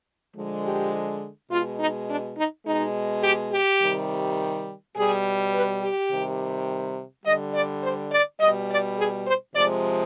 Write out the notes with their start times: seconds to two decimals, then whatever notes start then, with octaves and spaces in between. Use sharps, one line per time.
0.35 D3 F3 G#3
0.64 G4
1.50 B2 G#3 F4
1.79 D#4
2.07 D4
2.36 D#4
2.65 B2 G#3 D#4
3.22 G4
3.52 G4
3.80 C3 D#3 G3
4.94 B2 G3 G#4
5.53 B4
5.81 G4
6.10 C3 D#3 G3
7.25 D3 G3 D#5
7.53 D5
7.82 C5
8.11 D5
8.40 B2 G3 D#5
8.69 D5
8.97 G#4
9.26 C5
9.54 C3 F3 G#3 D5